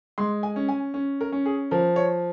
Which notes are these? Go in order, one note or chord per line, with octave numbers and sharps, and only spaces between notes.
G#3 C6
G#5
C#4
G#5
C#4
A#4
C#4
G#4
F3 A#4
C#5